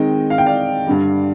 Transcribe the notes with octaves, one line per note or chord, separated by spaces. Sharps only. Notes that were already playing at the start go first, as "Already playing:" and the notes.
Already playing: D#3 G#3 C4 D#4 D#5 G5
F5
G5
D5 F5
G2 D3 G3